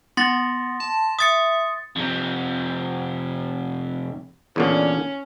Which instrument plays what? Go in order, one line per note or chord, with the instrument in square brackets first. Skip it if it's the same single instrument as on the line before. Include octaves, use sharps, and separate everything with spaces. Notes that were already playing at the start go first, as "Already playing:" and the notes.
[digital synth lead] B3 [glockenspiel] C6 A6 A#6
[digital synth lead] A5
[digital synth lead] E5 [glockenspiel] D#6 A6 C#7
[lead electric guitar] F2 C3
[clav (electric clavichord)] E2 A#2 D3 [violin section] C#4